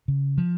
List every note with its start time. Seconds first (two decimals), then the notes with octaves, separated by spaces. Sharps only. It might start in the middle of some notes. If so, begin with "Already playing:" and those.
0.08 C#3
0.38 F3